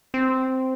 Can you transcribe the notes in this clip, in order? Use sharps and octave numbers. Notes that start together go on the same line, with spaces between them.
C4